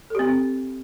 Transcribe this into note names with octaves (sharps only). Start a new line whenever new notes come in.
C4 G4 A4